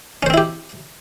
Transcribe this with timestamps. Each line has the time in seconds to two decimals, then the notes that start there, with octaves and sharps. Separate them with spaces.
0.23 C#4
0.26 C5
0.30 C4
0.34 E4
0.38 G4